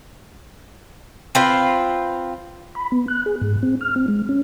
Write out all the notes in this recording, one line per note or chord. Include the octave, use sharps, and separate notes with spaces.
C4 F4 B4
B5
B3
F#6
G#4
G#2
C4
F6
C4
G#3
C#4